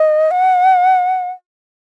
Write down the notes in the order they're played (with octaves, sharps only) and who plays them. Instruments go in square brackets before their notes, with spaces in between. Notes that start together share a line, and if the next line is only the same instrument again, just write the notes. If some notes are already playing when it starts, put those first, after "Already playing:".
Already playing: [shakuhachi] D#5
F#5